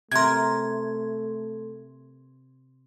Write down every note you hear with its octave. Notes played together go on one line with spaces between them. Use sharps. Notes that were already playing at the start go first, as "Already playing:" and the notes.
C3 A3 A#4 C6 G#6